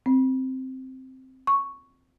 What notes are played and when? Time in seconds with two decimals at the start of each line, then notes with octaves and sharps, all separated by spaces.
0.06 C4
1.47 C#6